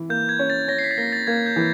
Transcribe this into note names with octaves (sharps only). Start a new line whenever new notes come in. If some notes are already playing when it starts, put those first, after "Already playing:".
Already playing: E3
A#3 G6
G#6
C#4
A6
C#4 A#6
C7
B6
A6
A#3 A#6
A6
A#3 G#6
G6
E3